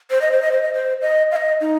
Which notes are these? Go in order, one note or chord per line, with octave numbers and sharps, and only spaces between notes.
C5
D#5
C5
D#5
C5
D#5
C5
D#5
F5
D#5
D#4